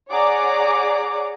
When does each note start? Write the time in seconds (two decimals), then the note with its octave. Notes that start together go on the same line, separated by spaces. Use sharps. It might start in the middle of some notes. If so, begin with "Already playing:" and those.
0.10 G#4 C#5 D5 F#5 A#5 D6